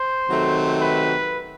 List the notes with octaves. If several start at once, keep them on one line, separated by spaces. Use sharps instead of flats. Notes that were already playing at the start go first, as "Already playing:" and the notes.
Already playing: C5
C3 D#3 F#3 A3
B4